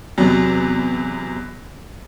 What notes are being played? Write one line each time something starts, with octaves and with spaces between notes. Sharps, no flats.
E2 C3 F#3